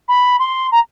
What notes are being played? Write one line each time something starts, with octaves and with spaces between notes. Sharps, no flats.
B5
C6
A#5